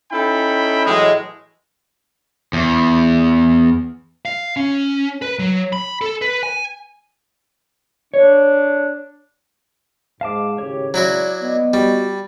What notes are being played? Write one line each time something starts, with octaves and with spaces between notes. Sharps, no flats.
C#4 D#4 E4 A4 G5 B5
A2 E3 F#3 G#3
E2
F5
C#4
B4
F#3
B5
A4
B4
G#5
D4 C#5
G#2 F5 A5 D6
G#1 A2 C#3 G4 C#5
F#3 E4 F#4 D5
B3 D#5
G3 F#4